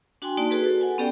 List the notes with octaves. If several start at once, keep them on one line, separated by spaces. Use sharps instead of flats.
D4 F#4 G5 G#5 C6
A#3 D#4 F#4 D5 A5
F#4 G#4 A4 B4
F#4 A4
F#5 G#5
B3 C#4 G4 A4 D5 G5